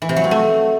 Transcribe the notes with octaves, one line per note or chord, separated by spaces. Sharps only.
E3
C3
F#3
C4
A3